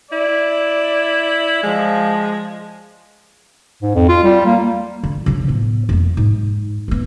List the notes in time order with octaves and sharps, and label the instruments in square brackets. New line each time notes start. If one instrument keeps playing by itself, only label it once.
[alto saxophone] E4 [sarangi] D5
[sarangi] F3 [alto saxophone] G#3
[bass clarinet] G#2
F2
F4
G3
A#3
[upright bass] D3
C#3 F3
A2 B3
F2 A#3
G#2
A#3 B3